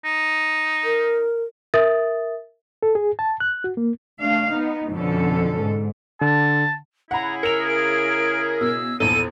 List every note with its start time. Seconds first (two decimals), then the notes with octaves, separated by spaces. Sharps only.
0.05 D#4
0.84 A#4
1.74 A#4 E5 D#6 A6
2.83 A4
2.95 G#4
3.19 A5
3.40 F#6
3.64 F#4
3.77 A#3
4.20 A3 D4 F5
4.52 B3 D#4
4.90 F2 B2 D3 C#4 A4
5.60 G#2
6.21 D3 A5
7.11 C#3 E4 G#4 F#5 A#5 B5
7.43 A#4 E6 C#7 F7
7.67 D7
8.61 B2 E6
9.00 A#1 E2 A4 D#7